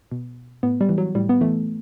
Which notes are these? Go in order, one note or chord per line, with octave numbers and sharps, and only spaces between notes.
B2
A2 B3
G3
E3
F#3
A2 G3
B3
E3 A3